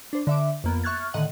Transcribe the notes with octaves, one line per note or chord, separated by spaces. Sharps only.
D4 C5
D3 E5 D6
F2 A#3 B3
E5 C#6 F6 F#6 G#6 A6
A2 D3 D#3 D#5 F#5